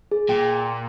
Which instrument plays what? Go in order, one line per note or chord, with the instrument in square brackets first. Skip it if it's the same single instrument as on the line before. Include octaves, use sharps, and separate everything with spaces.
[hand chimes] G#4
[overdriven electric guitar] A#2 [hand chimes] G5